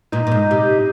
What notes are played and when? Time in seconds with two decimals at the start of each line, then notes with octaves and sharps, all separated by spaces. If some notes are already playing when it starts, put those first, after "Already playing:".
0.12 A#2 D#4
0.27 A#2
0.32 G#2
0.51 C3